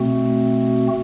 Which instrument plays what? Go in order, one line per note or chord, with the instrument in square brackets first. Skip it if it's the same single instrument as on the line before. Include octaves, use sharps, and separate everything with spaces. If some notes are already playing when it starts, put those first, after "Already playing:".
Already playing: [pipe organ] B2 A3 C4 F#4